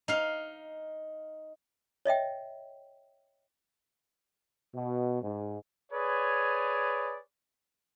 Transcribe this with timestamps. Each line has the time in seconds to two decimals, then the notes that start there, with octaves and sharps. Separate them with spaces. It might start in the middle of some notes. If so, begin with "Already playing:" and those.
0.08 D#4 F5
2.05 C#5 D#5 E5 G5
4.75 B2
5.23 G#2
5.92 G#4 B4 C#5 D5